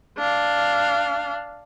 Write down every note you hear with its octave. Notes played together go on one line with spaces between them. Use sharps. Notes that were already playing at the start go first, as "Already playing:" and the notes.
D4 F5